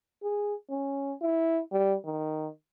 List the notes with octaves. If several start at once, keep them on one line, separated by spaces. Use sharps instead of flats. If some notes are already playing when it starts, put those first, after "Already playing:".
G#4
C#4
E4
G3
D#3